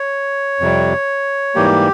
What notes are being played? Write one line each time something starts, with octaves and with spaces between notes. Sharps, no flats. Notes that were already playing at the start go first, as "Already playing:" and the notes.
Already playing: C#5
F2 C3 G3
G#2 E3 G3 A#3 G4